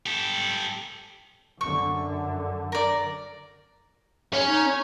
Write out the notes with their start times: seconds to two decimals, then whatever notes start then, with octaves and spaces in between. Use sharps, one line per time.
0.06 G4 A4
1.61 F#2 D3 C#6
2.72 A#4 D5
4.33 C#4 C#5
4.46 D#4
4.67 C#6